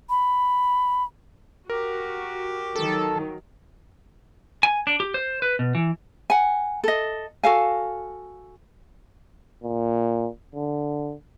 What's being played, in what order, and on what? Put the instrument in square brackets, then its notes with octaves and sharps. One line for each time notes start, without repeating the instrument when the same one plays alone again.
[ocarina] B5
[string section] F#4 [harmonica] G4 [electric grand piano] A#4
[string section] D#3 F#3 [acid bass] A4
[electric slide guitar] G#5
D4
G4
C5
B4
B2
E3
[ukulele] F#5 G#5
A4 D#5
F#4 A4 F5 G#5
[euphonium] A#2
D3